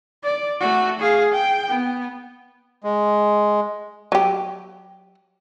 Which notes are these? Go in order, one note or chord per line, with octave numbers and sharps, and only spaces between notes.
D5
A3 F#4
G#4 F5
G5
B3
G#3
F#3 G4